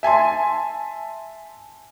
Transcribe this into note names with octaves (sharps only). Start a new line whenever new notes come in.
E5 G#5 A5 C6